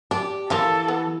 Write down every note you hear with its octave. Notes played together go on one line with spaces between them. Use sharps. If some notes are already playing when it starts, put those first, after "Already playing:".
D4 G4
D3 E3 F3 A#3 A4
B3